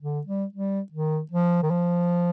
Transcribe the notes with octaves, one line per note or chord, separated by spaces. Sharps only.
D3
G3
G3
D#3
F3
D#3
F3